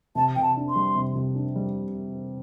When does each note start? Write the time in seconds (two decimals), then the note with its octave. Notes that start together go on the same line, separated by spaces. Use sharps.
0.15 C3 A5
0.36 C3 G5
0.42 A5
0.56 D4
0.69 C6
0.76 G3
0.95 C3
1.15 C3
1.35 D4
1.56 G3